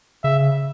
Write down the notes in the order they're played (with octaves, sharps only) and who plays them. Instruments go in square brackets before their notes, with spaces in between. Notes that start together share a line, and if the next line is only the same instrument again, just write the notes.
[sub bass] C#3 [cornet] E5